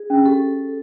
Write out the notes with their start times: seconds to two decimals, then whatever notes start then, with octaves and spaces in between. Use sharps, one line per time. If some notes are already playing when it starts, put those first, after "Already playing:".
Already playing: G#4
0.10 C#4
0.25 G4 A4